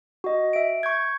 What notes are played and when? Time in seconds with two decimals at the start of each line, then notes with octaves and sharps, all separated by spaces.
0.24 F#4 D#5
0.53 E5 D7
0.83 C#6 G6 G#6